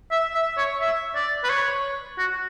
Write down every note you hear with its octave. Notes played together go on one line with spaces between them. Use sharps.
E5
E5
C#5
E5
D5
B4
C#5
F#4